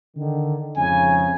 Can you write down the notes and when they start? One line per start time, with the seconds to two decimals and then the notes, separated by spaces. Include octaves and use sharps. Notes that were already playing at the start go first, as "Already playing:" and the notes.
0.16 D3 D#3
0.76 F2 G#2 C#3 G#5